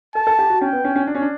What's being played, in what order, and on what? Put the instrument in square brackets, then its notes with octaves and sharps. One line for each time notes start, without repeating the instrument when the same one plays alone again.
[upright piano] A4 [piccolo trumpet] A5
[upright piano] A4
G4
F#4
[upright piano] C#4 [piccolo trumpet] G5
[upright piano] B3
C#4
C#4
D4
C#4
D4